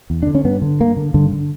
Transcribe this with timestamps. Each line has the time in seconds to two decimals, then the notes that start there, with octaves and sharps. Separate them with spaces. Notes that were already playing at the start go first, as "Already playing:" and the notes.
0.10 E2
0.23 D3 D4
0.35 C#4
0.44 G2 B3
0.62 D3
0.80 G2 A#3
0.97 D3
1.14 G2 D3
1.32 D3